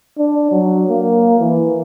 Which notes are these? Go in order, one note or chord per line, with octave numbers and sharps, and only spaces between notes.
D4
F#3
A#3
E3